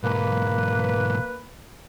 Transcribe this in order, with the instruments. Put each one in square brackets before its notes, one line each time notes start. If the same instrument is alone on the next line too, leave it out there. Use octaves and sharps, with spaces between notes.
[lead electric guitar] B1 G#2 [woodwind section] A#3 B4